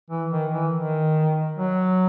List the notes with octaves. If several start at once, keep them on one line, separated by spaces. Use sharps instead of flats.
E3
D#3
E3
D#3
F#3